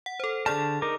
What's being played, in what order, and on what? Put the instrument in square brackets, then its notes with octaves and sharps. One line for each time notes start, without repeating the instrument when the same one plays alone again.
[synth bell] F#5
A4 C5
[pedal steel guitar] D3 A5 [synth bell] G#4 D5 F6
[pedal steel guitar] D#4 A#4 D6